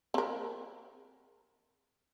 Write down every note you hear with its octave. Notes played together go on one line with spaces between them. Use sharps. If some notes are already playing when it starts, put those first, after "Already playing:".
C4 A#4